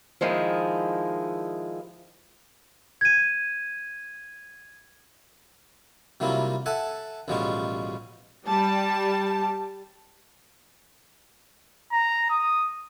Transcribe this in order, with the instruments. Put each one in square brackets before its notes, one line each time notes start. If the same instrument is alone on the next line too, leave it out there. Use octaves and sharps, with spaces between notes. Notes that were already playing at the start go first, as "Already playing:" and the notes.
[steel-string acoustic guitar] D#3 F3 G#3 E4
[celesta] G#6 D#7
[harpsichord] C3 F#3 G3 A#3 E4 F4
A4 E5 F#5 G#5 A5
A1 B2 F3 G3 G#3 C#4
[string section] G3 A5
[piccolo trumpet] A#5
D#6